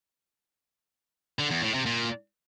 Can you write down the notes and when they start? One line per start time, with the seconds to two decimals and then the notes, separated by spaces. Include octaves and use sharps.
1.39 D3
1.51 E2
1.62 A2
1.74 C3
1.86 A#2